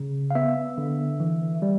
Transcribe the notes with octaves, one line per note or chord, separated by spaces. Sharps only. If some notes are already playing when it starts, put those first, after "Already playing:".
Already playing: C#3
F5
B3 E5
D3
E3
G3